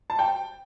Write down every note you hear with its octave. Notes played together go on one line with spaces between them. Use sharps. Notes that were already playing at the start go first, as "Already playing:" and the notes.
A5
G5